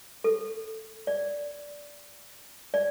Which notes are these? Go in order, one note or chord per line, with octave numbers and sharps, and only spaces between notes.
A4
D5
D5